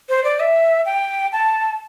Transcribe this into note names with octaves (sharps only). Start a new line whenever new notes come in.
C5
D5
E5
G5
A5